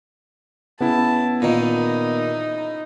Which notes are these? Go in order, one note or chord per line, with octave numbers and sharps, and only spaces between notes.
C#3 B3 E4 A5
A#2 D#3 D#4